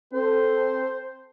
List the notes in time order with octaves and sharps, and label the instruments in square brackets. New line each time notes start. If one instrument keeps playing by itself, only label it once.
[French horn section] C4 A4 [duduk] C5